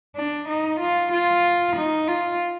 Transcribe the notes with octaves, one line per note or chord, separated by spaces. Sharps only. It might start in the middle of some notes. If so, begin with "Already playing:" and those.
D4
D#4
F4
F4
D#4
F4